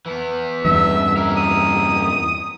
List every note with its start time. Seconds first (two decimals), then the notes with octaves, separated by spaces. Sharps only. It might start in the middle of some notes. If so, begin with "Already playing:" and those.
0.06 E3 B3
0.65 E2 G2 E5
1.17 E4 A#4
1.37 D#6